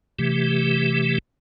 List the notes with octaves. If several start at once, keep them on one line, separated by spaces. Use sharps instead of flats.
C3 E3 A3 G4